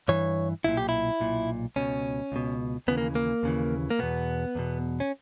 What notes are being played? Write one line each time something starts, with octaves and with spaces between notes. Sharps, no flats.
G2 E3 C#5
B1 A#2 E4
G4
E4
B1 A#2
C#2 B2 C#4
C#2 B2
D#2 C#3 E3 B3
A#3
A#3
D#2 C#3 E3
A#3
E2 B2 B3
E2 B2
C#4